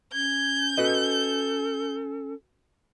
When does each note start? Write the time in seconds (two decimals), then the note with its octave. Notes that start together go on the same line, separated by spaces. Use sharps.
0.13 C#4 G6 G#6
0.78 F#4 A4 B4 D#5